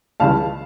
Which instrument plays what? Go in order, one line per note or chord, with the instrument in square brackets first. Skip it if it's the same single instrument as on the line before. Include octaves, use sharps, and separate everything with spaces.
[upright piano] C#2 C#3 E3 G3 F5 A5